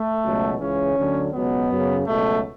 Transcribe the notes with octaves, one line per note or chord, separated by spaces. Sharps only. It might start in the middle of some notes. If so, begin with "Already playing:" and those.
Already playing: A3
C#2 B2 F#3
C#2 C#3 E3 C#4
D2 D3 F#3
C#2 B2 F#3 B3
F#2 C#3 F#3
C#2 B2 F#3 A3